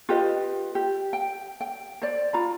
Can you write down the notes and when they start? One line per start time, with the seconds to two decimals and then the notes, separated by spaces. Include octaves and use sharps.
0.09 F4 G4 B4 D#5
0.75 G4
1.13 G5
1.61 G5
2.02 C5 D5
2.33 F4 A#5 B5